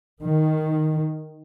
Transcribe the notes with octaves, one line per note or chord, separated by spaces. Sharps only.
D#3